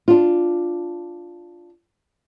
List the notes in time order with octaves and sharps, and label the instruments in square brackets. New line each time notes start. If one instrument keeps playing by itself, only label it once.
[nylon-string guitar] D4 F4